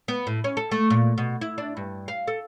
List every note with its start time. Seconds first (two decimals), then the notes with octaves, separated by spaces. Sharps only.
0.08 B3
0.27 A2
0.44 C#4
0.57 A4
0.71 A3
0.90 A#2
1.18 B2
1.41 E4
1.58 D4
1.77 G2
2.08 F5
2.27 A4